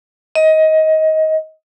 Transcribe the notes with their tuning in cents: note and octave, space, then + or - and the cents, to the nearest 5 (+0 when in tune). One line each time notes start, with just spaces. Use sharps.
D#5 +20